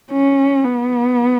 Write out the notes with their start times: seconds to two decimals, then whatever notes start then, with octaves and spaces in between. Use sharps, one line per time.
0.12 C#4
0.64 B3